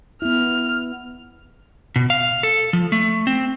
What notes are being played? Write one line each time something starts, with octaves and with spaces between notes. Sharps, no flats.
B3 E4 F6
B2
F5
A4
F3
A3
C4